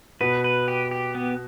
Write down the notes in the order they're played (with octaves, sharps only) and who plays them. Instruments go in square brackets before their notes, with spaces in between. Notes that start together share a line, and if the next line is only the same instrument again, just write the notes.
[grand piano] B2 B3 [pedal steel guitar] B4
[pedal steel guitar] B4
G4
G4
B3